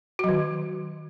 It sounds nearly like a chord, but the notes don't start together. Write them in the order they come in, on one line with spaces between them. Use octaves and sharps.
F#4 F#3 D#3